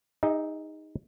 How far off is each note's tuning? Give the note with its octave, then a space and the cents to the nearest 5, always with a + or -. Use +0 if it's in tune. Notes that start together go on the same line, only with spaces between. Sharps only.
D#4 +0 G#4 -35 E5 -35